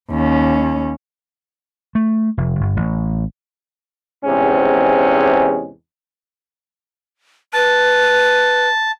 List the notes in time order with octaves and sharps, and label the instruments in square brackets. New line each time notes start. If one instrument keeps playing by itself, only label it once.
[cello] D#2 C#4
[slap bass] A3
F1
G1
A1
[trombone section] E2 G#2 C3 G#3 C#4
[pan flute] B4 [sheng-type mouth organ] A5